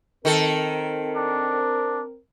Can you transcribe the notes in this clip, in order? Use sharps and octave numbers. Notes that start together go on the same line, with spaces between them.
D#3 C4 A4 A#4
D4